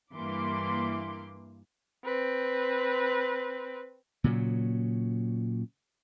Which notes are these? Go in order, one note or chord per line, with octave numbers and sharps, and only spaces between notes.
G2 E3 A#3 C6 D6
C4 B4
A#2 C#3 F#3